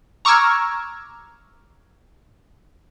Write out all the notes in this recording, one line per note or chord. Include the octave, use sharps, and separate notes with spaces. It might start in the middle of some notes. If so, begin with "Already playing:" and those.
A#5 C#6 D6 E6 F6 G#6